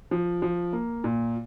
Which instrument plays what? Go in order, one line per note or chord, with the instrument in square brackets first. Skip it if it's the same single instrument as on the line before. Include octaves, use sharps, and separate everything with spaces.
[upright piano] F3
F3
A#3
A#2